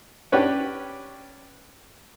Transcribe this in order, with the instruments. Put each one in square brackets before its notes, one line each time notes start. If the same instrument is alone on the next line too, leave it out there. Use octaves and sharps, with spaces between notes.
[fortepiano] C#4 D4 G4 B4 C#5